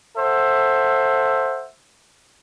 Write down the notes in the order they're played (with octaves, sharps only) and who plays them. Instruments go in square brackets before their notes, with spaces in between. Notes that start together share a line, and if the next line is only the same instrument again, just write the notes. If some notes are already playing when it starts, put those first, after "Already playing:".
[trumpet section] A4 C5 E5 F#5